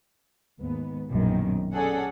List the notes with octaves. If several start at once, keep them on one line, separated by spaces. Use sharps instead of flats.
D#2 G#2 B3
A#1 F#2 B2 D#3
C#4 G#4 A4 D5 F#5